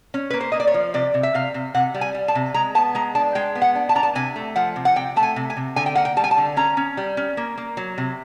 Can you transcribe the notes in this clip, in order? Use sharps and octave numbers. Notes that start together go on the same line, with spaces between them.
C#4
A#3 B4
C5
A#3 D#5
D5
C#5
F3
C3 D5
C3
E5
C3 F5
C3
C3 F#5
G3
G#5
G3
A5
C3
G#3 A#5
B3 A5
G#3 A#5
D4 A5
G#3 G5
B3
F#5
D4
A5
D4 A#5
A5
C3 G#5
A3
F3 F#5
C3
F#5
C3 G5
A3 A5
G#5
C3
G#5
C3
D3 G#5
G5
A#3 F#5
G5
G3 A5
G#5
A5
D3
C#4 A#5
C#4
G3
C#4
A#3
A#3
F#3
C3